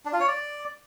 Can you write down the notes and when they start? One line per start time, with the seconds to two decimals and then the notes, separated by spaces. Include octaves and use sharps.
0.05 D4
0.13 F4
0.20 C#5
0.28 D5